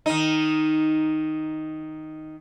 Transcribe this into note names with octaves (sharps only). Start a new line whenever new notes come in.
D#3 D#4